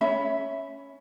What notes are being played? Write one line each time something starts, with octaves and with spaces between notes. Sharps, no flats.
C#4 E5 B5